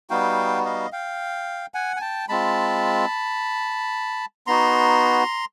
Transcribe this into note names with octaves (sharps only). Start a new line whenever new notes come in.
G3 B3 D#4 F#4 F5 G5
D#5 F5
F5 G5
F#5 G#5
G#5
G5 A5
G#3 C4 F4 A5 B5
B3 D#4 F#4 A#5 C6